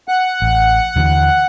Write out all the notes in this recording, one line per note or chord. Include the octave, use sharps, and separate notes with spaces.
F#5 F#6
A1
D#2 D3 E3